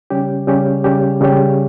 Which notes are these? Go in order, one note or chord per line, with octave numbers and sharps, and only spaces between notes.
C#3 G3 C#4 G4
C#3 G3 C#4 G4
C#3 G3 C#4 G4
C#3 G3 C#4 G4